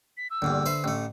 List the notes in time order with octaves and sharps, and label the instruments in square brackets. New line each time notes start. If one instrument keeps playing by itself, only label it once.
[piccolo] B6
E6
[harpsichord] A#1 E2 G2 [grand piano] D3
[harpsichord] B4 C5 E5
A1 A3